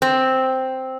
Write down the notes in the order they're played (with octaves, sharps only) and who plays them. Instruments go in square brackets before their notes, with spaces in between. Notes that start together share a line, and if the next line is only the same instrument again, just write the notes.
[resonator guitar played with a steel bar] C4